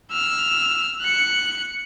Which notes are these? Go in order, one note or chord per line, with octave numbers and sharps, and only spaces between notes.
E6 F6
F#6 C#7